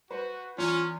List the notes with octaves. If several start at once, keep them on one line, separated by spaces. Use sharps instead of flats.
F#4 B4 C5
E2 C#4 F4